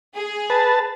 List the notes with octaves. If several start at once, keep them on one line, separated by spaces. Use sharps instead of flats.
G#4
B4 A5